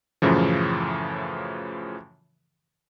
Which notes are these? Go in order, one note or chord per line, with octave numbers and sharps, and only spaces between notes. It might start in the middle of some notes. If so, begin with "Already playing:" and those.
F#2 A2 C#3 E3 F3